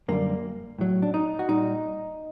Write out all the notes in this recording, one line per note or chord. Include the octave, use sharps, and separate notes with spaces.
F#2 D3 G3 A#3
A2 F#3
D4
D#4
F#4
A#2 G3 D#4